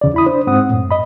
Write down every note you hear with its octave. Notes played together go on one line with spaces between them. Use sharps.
E2 C#3 D5
E4 B5 D#6
D4 C5
G#2 C4 F#5 D#6
F#2 A2
D#5 B5